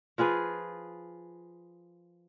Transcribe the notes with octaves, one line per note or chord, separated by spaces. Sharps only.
F3 F4 G#4 B4